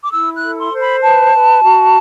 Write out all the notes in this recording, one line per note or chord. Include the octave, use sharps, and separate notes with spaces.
D6
E4 E6
F#6
A4
C6
C5
B5
B4 A5
B4
F#4